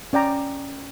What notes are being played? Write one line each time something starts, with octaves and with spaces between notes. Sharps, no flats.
C#4 D5 G5 A#5